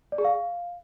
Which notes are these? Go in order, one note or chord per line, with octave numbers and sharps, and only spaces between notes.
D5
G#4
F5